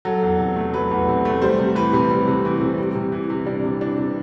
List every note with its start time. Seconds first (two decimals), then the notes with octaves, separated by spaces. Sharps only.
0.05 F#3 A4
0.22 E2
0.39 C3
0.56 A3
0.73 F#3 B4
0.91 E2
1.08 C3
1.25 A3
1.42 G3 C5
1.59 C3
1.76 E3 B4
1.93 C3
2.10 G3
2.28 C3
2.45 E3
2.61 C3
2.78 G3
2.95 C3
3.12 E3
3.30 C3
3.46 G3 D4
3.64 C3
3.81 E3 D4
3.98 C3